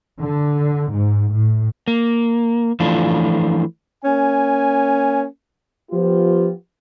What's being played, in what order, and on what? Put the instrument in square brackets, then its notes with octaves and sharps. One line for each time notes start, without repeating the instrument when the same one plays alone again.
[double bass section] D3
G#2
A2
[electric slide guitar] A#3
E3 F3 A3 D4 F4
[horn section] A#3 C#4 G#5
[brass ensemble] F3 B3 F4 G4